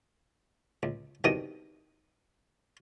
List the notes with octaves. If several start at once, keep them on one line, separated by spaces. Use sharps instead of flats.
C#2
C2 B2 D#3 D5 A#5 D#6